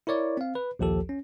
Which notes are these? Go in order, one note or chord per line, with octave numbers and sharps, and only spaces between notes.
E4 A#4 C#5 D5
C4 F5
B4
A#1 D#2 F3 G4 A4
C#4